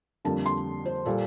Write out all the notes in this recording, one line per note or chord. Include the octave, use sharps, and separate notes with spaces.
F2 D3 G3 A#3 A5
C6
C5
A#2 G3 A4